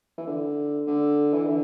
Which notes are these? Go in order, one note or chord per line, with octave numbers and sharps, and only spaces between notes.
E3
D3
D3
E3
D3